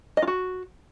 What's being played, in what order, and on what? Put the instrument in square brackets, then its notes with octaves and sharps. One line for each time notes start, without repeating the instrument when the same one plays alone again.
[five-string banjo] D#5
F4
F#4